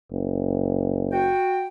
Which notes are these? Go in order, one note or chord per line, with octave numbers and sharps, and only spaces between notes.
F#1
F#4 G5